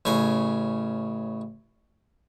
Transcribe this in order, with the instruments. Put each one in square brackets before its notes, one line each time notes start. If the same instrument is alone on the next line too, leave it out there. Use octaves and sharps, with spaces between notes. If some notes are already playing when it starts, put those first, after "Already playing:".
[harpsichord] A1 C#3 G#5